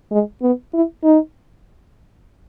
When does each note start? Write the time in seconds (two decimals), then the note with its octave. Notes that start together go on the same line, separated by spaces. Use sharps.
0.11 G#3
0.42 B3
0.73 E4
1.03 D#4